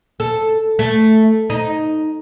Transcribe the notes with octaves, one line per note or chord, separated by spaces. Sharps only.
A4
A3
D#4